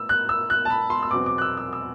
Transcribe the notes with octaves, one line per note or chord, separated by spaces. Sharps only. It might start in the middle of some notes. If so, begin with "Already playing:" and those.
Already playing: A2 B3 E6
F#6
E6
F#6
A5
B5
C6
E6
E2 B2 F#3 C4 D6
D6
F#6
E6
E6
E6